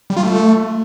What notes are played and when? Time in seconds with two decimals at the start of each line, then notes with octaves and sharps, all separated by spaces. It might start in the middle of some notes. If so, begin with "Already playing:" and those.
0.10 G3
0.16 F4
0.23 A3